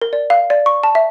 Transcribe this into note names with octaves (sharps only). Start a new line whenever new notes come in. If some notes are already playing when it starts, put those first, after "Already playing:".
A#4
D5
F5
D5
C#6
A5
E5